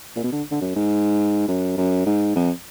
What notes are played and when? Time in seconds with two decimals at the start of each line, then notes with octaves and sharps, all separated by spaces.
0.16 A#2
0.23 B2
0.32 D3
0.51 D3
0.61 F#2
0.75 G#2
1.48 F#2
1.77 F#2
2.06 G#2
2.35 F2